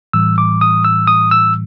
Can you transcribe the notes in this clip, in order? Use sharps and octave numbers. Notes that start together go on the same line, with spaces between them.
A2 E3 G3 E6
D6
D#6
E6
D#6
E6